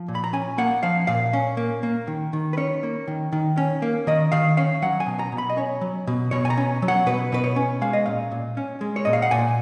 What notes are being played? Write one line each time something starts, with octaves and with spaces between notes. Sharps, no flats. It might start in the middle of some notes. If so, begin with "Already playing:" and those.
Already playing: F3
A#2
B5
A#5
C#4 G#5
A#3 F#5
F3 F5
A#2 F5
C#4
A#3
A#3
D#3
D#3
B4
C#4 C#5
A#3
D#3
D#3
C#4
A#3
D#3 D#5
D#3 F5
C#4 F5
F#3 F#5
G#5
B2
A#5
B2
B5
D#5
C#4 C#5
F#3
B2
B2 C#5
G#5
A#5
C#4
F#3
F#5
B2 B4
B2 B4
C#5
C#4
G#3 F5
D#5
A#2 F5
A#2
C#4
G#3
C#5
A#2 D#5
F5
F#5
A#2 G#5